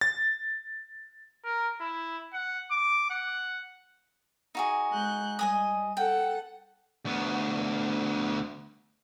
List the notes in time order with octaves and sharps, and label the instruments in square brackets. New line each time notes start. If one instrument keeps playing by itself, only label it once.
[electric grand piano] A6
[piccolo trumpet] A#4
E4
F#5
D6
F#5
[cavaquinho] D#4 F#4 G#4
[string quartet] G#3 F#6 G6
[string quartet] G3 [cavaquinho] D#5 G#5 D#6
[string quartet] A4 F#5 [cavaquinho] G5
[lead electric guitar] D2 B3